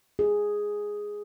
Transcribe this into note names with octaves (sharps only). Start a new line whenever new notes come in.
G#4